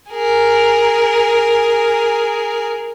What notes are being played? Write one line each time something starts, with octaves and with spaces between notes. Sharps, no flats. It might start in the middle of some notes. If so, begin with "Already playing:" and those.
G#4 A#4